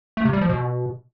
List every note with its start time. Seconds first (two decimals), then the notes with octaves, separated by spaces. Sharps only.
0.17 A3
0.25 C3
0.33 G3
0.41 F3
0.50 B2